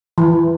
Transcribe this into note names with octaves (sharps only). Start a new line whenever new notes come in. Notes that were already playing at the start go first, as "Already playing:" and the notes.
E3